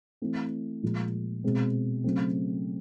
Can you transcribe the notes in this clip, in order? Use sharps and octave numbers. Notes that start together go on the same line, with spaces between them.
E3 A3 C4
A#2 F3 G#3
B2 G#3 C4
C#3 F#3 A3 C4